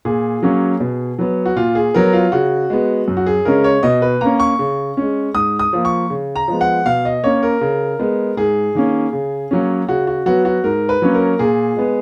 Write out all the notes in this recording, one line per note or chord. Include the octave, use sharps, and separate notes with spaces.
A#2 G#4
F#3 A#3 C#4
B2
F#3 B3
F#4
A#2 F4
G#4
F#3 B3 A#4
F4
C#3 F#4
G#3 B3
F#2
F#4
G#4
C#3 G#3 C#4 A#4
C#5
B2 D#5
B4
A#3 C#4 A#5
C#6
C#3
G#3 C#4
G#2 D#6
D#6
F3 A#3
C#6
C#3
A#5
F3 G#3 B3
F#5
B2 F5
D#5
A#3 C#4 C#5
A#4
C#3
G#3 B3
G#2 G#4
D#3 A#3 C#4
C#3
F#3 A#3 C#4
C#3 F#4
F#4
F#3 B3 F#4
F#4
G#2 A#4
B4
F#3 A#3 C#4
A#4
A#2 G#4
G#3 B3